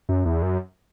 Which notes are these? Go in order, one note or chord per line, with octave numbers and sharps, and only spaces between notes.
F#2
E2
F#2